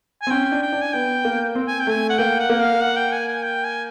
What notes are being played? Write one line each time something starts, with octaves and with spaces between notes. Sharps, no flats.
G#5
C4
C#4 G5
D4
G5
D4
G#5
B3 G5
A#3
C4
G#5
G5
A3 G#5
F#5
A#3 G5
F#5
A#3
F5
F#5
G5
G#5
G#5
G5
G#5